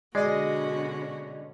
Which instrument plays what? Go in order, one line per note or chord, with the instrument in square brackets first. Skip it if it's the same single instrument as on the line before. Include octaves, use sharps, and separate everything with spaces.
[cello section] B2 D3 C#4 [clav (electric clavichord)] G#3 [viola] F#4 [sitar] D5 D#5